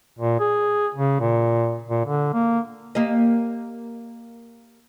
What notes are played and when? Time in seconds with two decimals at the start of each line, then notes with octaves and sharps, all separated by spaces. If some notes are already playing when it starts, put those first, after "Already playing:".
0.18 A#2
0.40 G#4
0.95 C#3
1.20 A#2
1.89 A#2
2.05 D3
2.34 A#3
2.95 A#3 G4 D#5